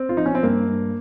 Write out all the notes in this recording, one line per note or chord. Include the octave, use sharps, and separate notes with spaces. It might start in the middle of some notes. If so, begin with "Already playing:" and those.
Already playing: C4
F4
F3 D#4
C#4
C4
G2 A#3
G2